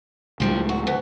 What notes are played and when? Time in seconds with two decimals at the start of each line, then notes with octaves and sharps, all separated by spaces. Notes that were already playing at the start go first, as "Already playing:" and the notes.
0.40 C#2 A2 F3 G3 D4
0.69 F#4
0.87 D2 B3